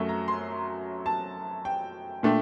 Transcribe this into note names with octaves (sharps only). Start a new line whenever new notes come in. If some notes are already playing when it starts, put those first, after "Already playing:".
Already playing: F#2 F#3 A3
A#5
C6
A5
G5
A#2 A3 D4 G5